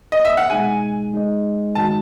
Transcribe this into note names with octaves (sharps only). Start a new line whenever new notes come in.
D#5
E5
F#5
B2 G#3 D#4 G#4 G#5
G#3 D#4 G#4 D#5
F#2 D#3 G#3 D#4 F#4 A5